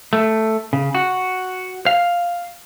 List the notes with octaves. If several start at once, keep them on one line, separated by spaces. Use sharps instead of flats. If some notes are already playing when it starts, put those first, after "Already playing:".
A3
C#3
F#4
F5